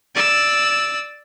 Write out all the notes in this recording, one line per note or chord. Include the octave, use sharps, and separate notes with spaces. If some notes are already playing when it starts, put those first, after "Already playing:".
D5 E6